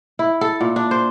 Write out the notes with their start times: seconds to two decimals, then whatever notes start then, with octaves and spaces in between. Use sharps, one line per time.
0.19 E4
0.41 A4
0.61 A#2
0.76 D4
0.91 C5